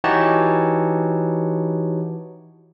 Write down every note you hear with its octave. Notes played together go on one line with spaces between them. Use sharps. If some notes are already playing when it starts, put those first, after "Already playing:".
E3 D#4 F#4 G4 C#5 A5